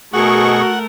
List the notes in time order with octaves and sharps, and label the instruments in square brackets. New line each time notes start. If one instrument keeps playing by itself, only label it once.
[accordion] B2 G#4 C#6 [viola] A3 A#4 [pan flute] F#4 [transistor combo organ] F#5